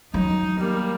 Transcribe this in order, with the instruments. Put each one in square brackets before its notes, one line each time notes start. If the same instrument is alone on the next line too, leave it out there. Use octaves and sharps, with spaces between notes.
[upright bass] D#3 F#3 [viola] D#4
[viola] G3 A#3